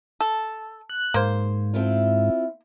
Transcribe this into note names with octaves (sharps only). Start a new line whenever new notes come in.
A4
F#6
G#2 A#3 C5
C4 E4 F4